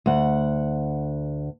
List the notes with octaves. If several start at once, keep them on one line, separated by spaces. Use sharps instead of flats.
D2 F#5